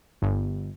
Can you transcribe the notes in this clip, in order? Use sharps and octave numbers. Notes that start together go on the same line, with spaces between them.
G1